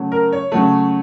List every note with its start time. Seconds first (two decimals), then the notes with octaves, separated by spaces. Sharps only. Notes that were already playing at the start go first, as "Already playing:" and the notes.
Already playing: C#3 F#3 A3
0.12 A#4
0.32 C#5
0.52 C#3 F#3 A3